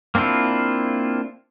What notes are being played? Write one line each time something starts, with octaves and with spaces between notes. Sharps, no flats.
A#3 C4 D4 E4 F4